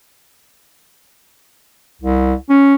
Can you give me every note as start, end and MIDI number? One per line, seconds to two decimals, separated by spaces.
2.02 2.34 36
2.49 2.75 61